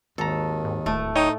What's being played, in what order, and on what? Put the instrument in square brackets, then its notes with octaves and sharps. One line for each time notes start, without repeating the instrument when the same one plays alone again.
[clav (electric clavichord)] G#1 A#5 [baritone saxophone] D#2 [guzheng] A4
[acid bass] G#2
[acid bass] D1 [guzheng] A2 A3
[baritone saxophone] D#4 [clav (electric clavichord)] C#5 D#5 G5